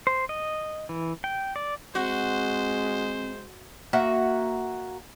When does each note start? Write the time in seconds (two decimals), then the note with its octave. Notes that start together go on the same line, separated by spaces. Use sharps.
0.07 C5
0.29 D#5
0.89 E3
1.24 G5
1.56 D5
1.95 G#3 C4 F#4 C5
3.93 A#3 F#4 E5 F#5